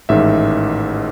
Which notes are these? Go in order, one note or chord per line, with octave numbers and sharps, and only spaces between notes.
A1 G#2 D#3 E5